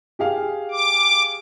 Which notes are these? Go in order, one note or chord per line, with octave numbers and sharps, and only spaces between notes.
G4 G#4 F5
D6